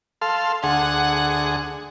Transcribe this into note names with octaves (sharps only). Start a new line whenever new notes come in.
A4 F5 C6
D2 G#4 F#5